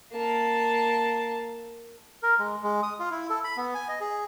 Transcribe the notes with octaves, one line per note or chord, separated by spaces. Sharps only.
A#3 A5
A#4
G#3
G#3
D#6
F4
E4
A4
B5
B3
G#5
D#5
G#4